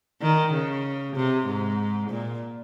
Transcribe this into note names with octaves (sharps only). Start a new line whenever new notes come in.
D#3
C#3
C3
G#2
A#2